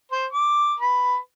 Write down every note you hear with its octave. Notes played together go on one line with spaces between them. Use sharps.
C5
D6
B4